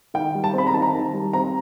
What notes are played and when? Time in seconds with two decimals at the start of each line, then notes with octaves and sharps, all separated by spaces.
0.14 D#3 G5
0.35 G3
0.44 A5
0.54 C4 B5
0.67 A#5
0.74 D#3 A5
0.82 A#5
0.94 D#3
1.14 G3
1.33 C4 A#5